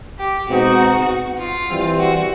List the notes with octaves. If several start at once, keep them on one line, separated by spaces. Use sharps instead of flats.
G4
B2 G#3 C4 D#4 F#4
F4
E3 G3 C4
F#4